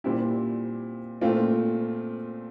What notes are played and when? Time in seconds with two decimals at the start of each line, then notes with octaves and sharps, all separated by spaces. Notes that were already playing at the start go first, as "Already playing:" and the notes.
0.04 A#2 G3 C4 E4 G4
1.21 A#2 A3 C4 F4